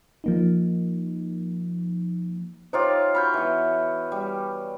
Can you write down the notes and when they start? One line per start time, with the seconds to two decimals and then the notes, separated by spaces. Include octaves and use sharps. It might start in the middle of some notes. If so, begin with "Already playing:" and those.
0.24 F3 A#3 D#4
2.73 D#4 F4 G4 C5 C#5
3.15 F#4 C#5 B5 F6 G6
3.34 E3 B3
4.12 G3